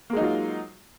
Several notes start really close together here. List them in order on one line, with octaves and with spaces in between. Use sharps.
A#3 G#3 D#4 F#3 F4